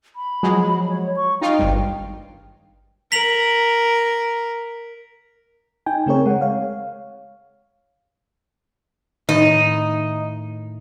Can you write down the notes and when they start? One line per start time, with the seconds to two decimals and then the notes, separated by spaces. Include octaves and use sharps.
0.16 B5
0.43 F3 F#3 G#3
0.89 C#5
1.16 C#6
1.41 D#4 F4 F5 G5
1.59 G#1 G2
3.12 A#4 B6 F7 F#7
5.86 D#4 G5 G#5
6.06 C#3 A3 C4 G#4 A#4 C#5
6.26 G#3 F#5
6.41 C#5 F5
9.29 A2 D#3 D#4